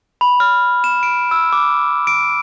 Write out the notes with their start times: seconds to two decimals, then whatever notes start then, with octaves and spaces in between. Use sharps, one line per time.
0.21 B5
0.40 F6
0.84 E7
1.03 D7
1.31 E6
1.53 D6
2.07 D7